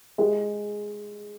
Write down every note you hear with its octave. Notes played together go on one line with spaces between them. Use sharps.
G#3